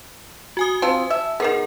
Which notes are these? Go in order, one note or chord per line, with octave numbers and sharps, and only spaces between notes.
F#4 G#5 D#6
C4 F4 A5
E5
D#3 B3 G#4 A#4